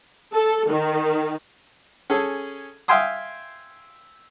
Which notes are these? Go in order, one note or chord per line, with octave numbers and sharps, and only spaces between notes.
A4
D#3
C#4 G#4 A4
E5 F5 G5 G#5 C6 D#6